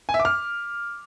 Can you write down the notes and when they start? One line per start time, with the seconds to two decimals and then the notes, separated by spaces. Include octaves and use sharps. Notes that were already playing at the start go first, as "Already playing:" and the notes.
0.09 G#5
0.14 E5
0.20 D6
0.25 F6